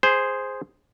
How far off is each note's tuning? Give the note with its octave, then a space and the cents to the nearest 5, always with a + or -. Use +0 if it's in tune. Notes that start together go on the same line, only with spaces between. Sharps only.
G#4 -5 C5 +0